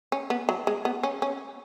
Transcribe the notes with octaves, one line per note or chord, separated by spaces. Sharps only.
C#4
B3
F#3
G#3
B3
C#4
C#4